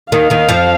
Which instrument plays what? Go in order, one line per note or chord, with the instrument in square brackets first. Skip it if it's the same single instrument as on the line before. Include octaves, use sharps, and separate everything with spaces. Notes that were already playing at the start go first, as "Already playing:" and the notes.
[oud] D#2 D#3 [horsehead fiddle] F5
[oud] D#2 D#3
F2 F3